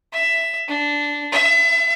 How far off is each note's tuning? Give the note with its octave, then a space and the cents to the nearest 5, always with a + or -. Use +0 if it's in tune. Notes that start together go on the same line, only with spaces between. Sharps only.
E5 +10
D4 -10
E5 +30